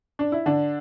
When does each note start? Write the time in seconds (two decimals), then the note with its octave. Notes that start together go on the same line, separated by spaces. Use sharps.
0.19 D4
0.32 E4
0.46 D3 D4